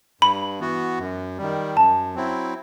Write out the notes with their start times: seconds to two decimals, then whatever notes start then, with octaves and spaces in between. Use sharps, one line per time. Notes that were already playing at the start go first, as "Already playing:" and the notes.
0.21 G2 B5
0.60 E3 B3 F#4
0.99 F#2
1.38 D#3 G3
1.76 F#2 A5
2.15 F#3 C4 E4